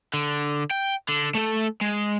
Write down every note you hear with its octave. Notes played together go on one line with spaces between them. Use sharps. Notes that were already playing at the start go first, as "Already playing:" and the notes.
D3
G5
D3
A3 A4
G#3